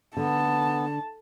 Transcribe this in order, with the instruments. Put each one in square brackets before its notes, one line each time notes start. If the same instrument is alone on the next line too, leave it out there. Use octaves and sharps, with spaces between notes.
[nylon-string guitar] D3 [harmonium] B3 [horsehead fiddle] A5